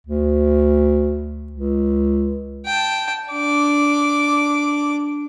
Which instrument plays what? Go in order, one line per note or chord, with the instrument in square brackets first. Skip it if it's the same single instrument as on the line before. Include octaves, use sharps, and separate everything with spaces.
[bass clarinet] D2
C#2
[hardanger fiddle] G5 A5
D4 D6